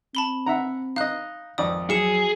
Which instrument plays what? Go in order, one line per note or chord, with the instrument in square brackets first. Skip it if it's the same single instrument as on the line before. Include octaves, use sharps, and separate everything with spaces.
[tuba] C4 [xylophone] A5 B5 G7
[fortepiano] E5 F#5 A#5
[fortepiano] D#4 D#5 [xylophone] F5 F#6
[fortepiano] G#1 F2 D5 [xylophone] D#6
[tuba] F#3 [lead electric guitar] G#4 [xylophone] C#7 E7